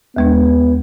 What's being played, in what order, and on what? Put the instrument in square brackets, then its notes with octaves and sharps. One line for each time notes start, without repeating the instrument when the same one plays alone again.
[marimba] D#2 G#3 D4 [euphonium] B3